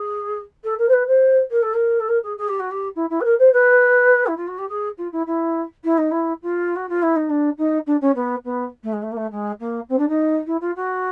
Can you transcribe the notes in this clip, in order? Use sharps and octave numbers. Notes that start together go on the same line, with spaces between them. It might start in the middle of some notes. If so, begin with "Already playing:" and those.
Already playing: G#4
A4
A#4
C5
B4
C5
A#4
A4
A#4
A4
A#4
G#4
G#4
G4
F#4
G4
E4
E4
B4
A#4
C5
B4
E4
F4
F#4
G4
G#4
F4
E4
E4
E4
D#4
E4
F4
F#4
F4
E4
D#4
D4
D#4
D4
C#4
B3
B3
A3
G#3
A3
A#3
A3
G#3
A#3
C4
D4
D#4
E4
F4
F#4